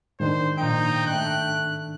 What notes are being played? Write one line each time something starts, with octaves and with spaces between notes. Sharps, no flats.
G#2 D#3 D4 C5
A#2 F3 D#4 G5
A3 F#6